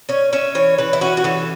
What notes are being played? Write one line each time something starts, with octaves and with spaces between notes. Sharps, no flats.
C#4 C#5
C#4 E5
E3 C#5
E3 B4
E4
C#4 F#4
F#4
E3 A4